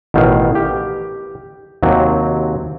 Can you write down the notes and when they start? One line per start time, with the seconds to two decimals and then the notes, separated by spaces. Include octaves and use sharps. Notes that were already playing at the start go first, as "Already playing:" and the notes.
0.14 A1 B2 D#3 F5
0.55 G4
1.83 D#2 C3 F#3 C4